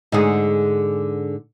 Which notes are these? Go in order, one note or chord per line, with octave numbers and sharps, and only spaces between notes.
G#2 D3 G#4